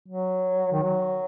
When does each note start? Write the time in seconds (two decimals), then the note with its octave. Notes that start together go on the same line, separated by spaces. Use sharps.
0.08 F#3
0.72 D#3
0.82 F#3